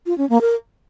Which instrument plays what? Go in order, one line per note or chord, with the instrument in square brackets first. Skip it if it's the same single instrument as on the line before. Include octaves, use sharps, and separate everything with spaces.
[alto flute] F4
C#4
A#3
A#4